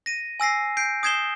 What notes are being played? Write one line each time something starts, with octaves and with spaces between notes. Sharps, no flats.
A#6 D#7
G#5 E6 A#6 C7
G6 C7 D7
D#6 G6 G#6 C7 E7 G7